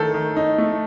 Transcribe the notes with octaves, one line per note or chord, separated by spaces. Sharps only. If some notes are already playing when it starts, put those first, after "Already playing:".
Already playing: D#3 A3 A4
D#3
D#4
A3